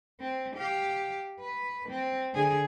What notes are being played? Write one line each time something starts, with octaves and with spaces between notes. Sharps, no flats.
C4
G4 F5
B4
C4
D3 G#4